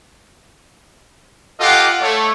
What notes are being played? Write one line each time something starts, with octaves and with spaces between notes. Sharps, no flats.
F4 G4 A4 D#5 F5 F#5
A3 C#5